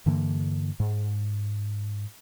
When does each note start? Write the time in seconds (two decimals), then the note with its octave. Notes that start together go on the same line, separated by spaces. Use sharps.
0.06 G2 D3 E3 A#3
0.80 G#2